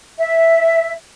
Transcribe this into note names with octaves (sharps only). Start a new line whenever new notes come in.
E5